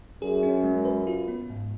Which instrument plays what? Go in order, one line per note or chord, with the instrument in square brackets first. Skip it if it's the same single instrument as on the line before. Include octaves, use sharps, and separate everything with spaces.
[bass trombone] F#2 [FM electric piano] G#4
[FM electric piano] C#4
G#3
B4
F4
B3
G#2